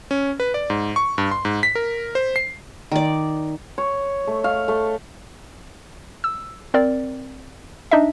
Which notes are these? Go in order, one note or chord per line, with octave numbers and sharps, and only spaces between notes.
C#4
B4
D5
G#2
C#6
G2
C6
G#2
B6
A#4
C5
C7
D#3 D5
C#5
A3
F5
A3
E6
C4 A#4 D5
D4 D#4 D#5 E5